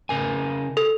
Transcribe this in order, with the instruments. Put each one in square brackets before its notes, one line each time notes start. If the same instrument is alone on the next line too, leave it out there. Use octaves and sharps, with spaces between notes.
[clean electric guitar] C#3 A#4 G#5
[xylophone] A4